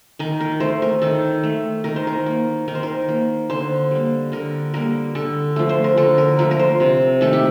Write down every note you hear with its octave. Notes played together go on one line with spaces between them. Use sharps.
D#3 A#4
A#4
A3 C5
A#4
D#3 A4
A3
D#3 A#4
C5
A#4
A#3
D#3 A#4
C5
A#4
A#3
D3 C5
G3 A#3
D3 A#4
G3 A#3 A#4
D3 A4
F3 A3
C5
A#4
D3 A4
A#4
F3 A3 A#4
A#4
C5
C3
D#3 A3 A4
G4